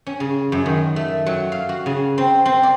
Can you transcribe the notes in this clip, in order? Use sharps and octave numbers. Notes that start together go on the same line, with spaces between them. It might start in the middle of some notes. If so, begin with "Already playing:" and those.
C#4
C#3
F#2
D#3
A3
F#3
F5
F#4
C#3
C4
C4
D5